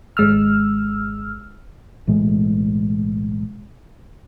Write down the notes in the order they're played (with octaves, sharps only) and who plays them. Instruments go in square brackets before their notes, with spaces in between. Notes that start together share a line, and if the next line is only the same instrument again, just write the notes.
[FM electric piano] G#1 G#3 E6 F6
[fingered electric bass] B1 A2 E3 G#3